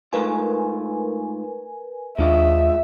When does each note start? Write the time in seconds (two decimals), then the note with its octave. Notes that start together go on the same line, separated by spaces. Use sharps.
0.13 G#2 A3 F4 A#4 B4 G#5
2.18 D#2 G#3 D4 F4 D#5 E5